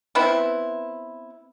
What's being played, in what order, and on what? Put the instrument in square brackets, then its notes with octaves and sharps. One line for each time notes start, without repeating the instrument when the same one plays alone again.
[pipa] B3 C4 E4